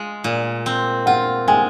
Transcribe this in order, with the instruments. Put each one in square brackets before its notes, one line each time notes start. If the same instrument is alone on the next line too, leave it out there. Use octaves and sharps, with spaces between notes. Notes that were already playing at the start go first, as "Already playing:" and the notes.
Already playing: [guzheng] G#3 F4
A#2
C4
[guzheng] F4 [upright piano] F#5
[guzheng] G#3 [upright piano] G#5